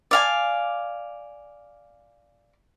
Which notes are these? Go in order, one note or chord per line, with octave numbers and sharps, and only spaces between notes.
D5 F5 G#5